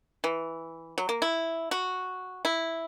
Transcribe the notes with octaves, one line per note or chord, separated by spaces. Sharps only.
E3
F#3
A#3
E4
F#4
E4